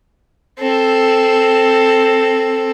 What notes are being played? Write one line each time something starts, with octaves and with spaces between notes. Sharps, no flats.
C4 A4